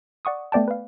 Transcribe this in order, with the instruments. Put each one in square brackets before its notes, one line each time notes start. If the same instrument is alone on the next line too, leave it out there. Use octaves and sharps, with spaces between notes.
[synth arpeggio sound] D5 F#5 C#6 D#6
A3 B3 D5 G5 A5
B4 F5